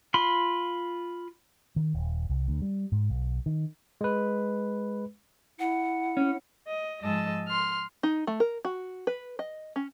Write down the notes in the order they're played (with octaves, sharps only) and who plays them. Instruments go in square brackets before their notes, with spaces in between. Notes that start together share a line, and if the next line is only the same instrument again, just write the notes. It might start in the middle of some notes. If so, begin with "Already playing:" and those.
[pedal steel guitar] F4 B5 C6
[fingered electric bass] D#3
D#1
C2
D2
G3
G#2
B1
D#3
[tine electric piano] G#3 B4
[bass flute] E4 [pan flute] F#5
[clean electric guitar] C#4
[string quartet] D#5
G#2 F3 G#3 D#5 A5 E6
C6 F6
[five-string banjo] D#4
A3
A#4
F#4
B4
D#5
C#4